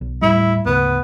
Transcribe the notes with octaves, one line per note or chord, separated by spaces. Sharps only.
B1
D#2 A2 G3 E4
D2 G#2 C#3 B3